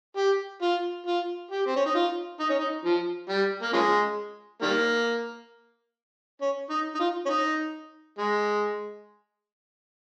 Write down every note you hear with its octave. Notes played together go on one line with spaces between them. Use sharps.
G4
F4
F4
G4
C4
C#4
D#4
F4
D#4
C#4
D#4
F3
G3
A#3
C#3 F3 G#3
D#3 G3 A#3
C#4
D#4
D#4
F4
C#4
D#4
G#3